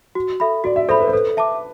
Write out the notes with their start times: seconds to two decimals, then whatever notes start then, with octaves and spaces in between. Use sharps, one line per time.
0.15 F#4
0.40 A4 E5 B5
0.64 F#4 D5
0.76 E5
0.89 A4 C5 E5 B5
1.00 B4
1.08 C5
1.13 A4 B4
1.37 E5 A5 D6